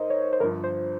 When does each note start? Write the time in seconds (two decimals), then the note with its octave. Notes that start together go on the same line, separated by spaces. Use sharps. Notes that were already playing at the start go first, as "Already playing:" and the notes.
Already playing: G#2 A#3 C5 D#5
0.10 C#5
0.33 C5
0.40 G1 G2 F3 A#4
0.64 C5